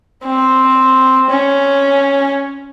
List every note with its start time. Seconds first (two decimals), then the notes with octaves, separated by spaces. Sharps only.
0.25 C4
1.30 C#4